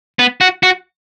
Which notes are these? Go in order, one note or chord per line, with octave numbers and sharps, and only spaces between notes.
B3
F#4
F#4